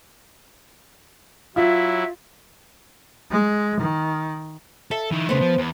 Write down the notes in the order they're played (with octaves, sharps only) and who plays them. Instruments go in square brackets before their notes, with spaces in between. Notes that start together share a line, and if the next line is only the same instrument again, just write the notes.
[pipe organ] F#3 E4 [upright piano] F4 [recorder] E5
[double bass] G#3
D#3
[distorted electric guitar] A4 [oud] E5
[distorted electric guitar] E3 D#4
[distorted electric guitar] C#3 A3 [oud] B3 C5
[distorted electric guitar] F3
E2